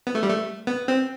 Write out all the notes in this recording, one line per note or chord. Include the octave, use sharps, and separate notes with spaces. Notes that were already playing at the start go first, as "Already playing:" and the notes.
B3
A3
G3
A3
B3
C4